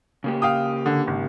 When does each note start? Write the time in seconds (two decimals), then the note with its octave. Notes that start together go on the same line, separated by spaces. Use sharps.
0.24 C#3 A#3 G4
0.42 F5 G5 D#6
0.86 D3
1.07 G#1